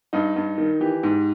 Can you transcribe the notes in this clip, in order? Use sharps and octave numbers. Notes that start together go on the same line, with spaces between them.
G2 D#4
G2
D#3
E3 G4
G#2